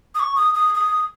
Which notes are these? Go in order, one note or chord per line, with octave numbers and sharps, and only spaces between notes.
D#6
C#6
D#6
D#6
D#6